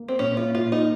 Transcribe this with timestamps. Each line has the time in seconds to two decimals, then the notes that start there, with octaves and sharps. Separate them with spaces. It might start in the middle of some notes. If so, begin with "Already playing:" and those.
Already playing: A#3
0.08 C4
0.19 A#2 C#4
0.37 F4
0.54 A#2 F4
0.72 D#4